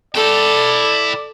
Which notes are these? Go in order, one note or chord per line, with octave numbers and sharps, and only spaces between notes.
E4 A4 D5 G5